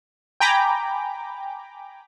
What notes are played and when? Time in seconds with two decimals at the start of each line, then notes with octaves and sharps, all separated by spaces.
0.40 G5 G#5 A#5 B5 D6